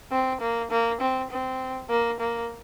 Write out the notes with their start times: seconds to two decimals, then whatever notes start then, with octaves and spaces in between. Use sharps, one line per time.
0.11 C4
0.41 A#3
0.71 A#3
1.00 C4
1.31 C4
1.89 A#3
2.20 A#3